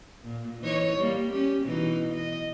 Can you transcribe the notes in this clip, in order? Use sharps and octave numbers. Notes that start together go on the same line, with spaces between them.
A#2
E3 D#4 C#5
G3 A#3
C#4 G4
B2 E3 D#4
D#5